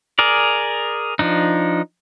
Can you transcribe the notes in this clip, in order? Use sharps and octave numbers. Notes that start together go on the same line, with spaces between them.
G#4 A#4 D5
F3 D4 D#4